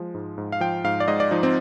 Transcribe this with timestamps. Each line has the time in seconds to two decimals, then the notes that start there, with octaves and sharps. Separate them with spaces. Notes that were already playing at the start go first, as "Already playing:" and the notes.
Already playing: F3 G#3
0.14 G#2
0.38 G#2
0.52 F5
0.60 F3 G5
0.84 G#2 F5
1.00 D5
1.08 G#2 D#5
1.20 D5
1.31 F3 D#4
1.43 C4